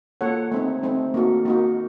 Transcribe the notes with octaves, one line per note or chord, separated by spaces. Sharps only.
A#3 F4 A4 C#5 F#5
A3 C4 D#4
A3 C4 D#4
A#3 D#4 F#4
A#3 D#4 F#4